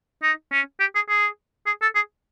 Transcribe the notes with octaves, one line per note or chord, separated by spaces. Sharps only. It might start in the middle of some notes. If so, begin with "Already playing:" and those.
D#4
C#4
G4
G#4
G#4
G#4
A4
G#4